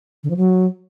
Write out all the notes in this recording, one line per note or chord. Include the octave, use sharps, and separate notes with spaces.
D3
F3
F#3